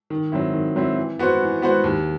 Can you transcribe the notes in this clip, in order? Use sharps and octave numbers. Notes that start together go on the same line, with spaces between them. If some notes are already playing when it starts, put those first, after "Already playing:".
D#3
F#3 C4 E4
D#3
F#3 C4 E4
E3
B3 F#4 C5
E3
B3 F#4 C5
D#2